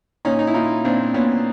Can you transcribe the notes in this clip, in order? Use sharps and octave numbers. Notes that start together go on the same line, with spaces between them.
A#2 C#4 D#4
D#4
E4
A#2 D#4 F4
A#2 C4 D4
A#2 B3 C#4